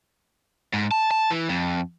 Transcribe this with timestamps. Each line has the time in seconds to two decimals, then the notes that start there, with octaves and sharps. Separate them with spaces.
0.73 G#2
0.91 A5
1.11 A5
1.31 E3
1.49 F2